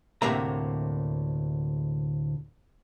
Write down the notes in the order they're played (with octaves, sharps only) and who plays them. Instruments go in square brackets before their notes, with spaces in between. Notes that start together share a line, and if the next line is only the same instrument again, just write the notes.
[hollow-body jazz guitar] D2 A2 C3 A#3 E5 A#5